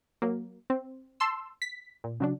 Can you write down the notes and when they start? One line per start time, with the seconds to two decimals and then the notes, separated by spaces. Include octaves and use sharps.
0.22 F#3 A#3
0.70 C4
1.20 A5 C6 E6
1.62 B6
2.04 A#2
2.20 C#3 F#3 D4